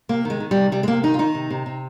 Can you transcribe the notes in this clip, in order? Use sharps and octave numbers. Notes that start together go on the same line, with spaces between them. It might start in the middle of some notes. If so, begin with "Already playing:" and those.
C3 A#3
D#3 G#3
D#3
G3
C3
C3 G3
G#3
C3 A#3
D#3 D#4
F4
D#3 D#4
C3
C3
C3